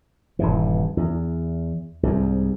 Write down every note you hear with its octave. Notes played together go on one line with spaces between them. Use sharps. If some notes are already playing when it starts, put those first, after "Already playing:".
D#1 G2 E3
E2
C2 G#2